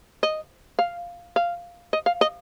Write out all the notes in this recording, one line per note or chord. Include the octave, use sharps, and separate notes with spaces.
D#5
F5
F5
D#5
F5
D#5